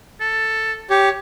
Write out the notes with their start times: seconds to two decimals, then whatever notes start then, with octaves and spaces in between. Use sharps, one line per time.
0.20 A4
0.90 G4 C#5